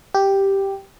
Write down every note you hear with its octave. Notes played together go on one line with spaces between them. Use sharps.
G4